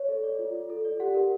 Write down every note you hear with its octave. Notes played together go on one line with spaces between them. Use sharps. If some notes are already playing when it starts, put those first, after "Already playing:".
Already playing: C#5
A4
D5
F4
F4
A4
D5
G4 F#5
A#4